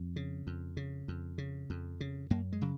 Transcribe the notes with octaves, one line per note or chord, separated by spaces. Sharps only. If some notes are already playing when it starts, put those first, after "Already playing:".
Already playing: F2
C#3
F2
C#3
F2
C#3
F2
C#3
F#2 A#3
G#3
C#3 F#3